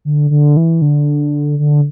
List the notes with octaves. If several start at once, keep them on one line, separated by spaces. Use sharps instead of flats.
D3
D3
E3
D3
D3